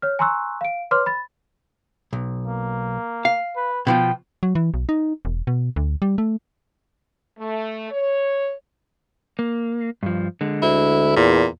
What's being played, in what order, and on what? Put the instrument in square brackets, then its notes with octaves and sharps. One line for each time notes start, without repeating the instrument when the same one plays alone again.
[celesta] C#5 F6
G#5 A#5 C6 C#6 E6 F#6
F5 D7
B4 C#5 C6 D6 F6
B5 A6
[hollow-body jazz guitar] B1
[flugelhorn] A#3
[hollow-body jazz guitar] F5
[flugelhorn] B4
[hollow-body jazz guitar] B2 E3 F3 [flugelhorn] G5
[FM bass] F#3
E3
B1
D#4
E1
B2
D2
G3
A3
[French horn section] A3
C#5
[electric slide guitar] A#3
G2 F3
D3 G#3
[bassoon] D2 [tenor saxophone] E4
[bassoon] E2 [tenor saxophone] A#2